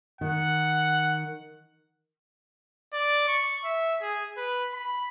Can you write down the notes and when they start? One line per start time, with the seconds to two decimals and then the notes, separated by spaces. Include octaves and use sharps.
0.21 D#3 F#5
2.93 D5
3.28 C#6
3.65 E5
4.02 G#4
4.37 B4
4.74 B5